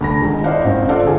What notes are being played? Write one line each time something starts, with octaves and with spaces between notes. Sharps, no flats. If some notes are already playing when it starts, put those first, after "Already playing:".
D2 B5 A#6
D#3 G#3
E4 C5 D5 D#5 F5 F#5
G#1 C4
F4 A4 D5 F5 F#5
D3 G#4